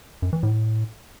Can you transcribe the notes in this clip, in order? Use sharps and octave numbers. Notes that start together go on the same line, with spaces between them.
F#2
E3
A2